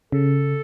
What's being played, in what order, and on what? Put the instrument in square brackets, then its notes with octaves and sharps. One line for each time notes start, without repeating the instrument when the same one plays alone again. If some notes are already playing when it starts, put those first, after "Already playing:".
[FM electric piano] C#3 [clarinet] A4